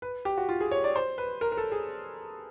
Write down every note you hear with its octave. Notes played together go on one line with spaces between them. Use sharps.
B4
G4
F#4
F4
G#4
C#5
D5
C5
B4
A#4
A#4
A4
G#4